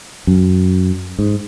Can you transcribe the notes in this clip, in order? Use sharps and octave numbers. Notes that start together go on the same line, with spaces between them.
F#2
G#2